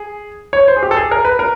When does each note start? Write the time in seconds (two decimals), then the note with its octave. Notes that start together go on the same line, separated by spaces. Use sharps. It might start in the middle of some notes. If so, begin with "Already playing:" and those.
Already playing: G#4
0.53 C#5
0.68 C5
0.76 G#4
0.83 G4
0.91 A4
0.96 G#4
1.11 A#4
1.25 B4
1.39 A#4